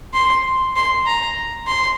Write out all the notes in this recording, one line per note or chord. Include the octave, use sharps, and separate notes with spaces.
C6
C6
A#5
C6